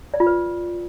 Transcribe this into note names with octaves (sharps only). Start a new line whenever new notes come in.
D5
F4
B4